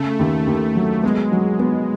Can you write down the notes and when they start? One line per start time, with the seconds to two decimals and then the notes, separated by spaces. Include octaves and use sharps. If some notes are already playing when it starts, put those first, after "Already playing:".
Already playing: C#3 A3
0.19 D#2
0.47 D#2
0.75 F#3
1.03 G#3 B3
1.32 F#3
1.59 B3